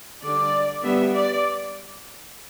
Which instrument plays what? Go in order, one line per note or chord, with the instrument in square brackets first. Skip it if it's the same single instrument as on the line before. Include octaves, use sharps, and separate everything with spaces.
[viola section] D3 G3 D4 D5
G3 B3 D4 E5
D5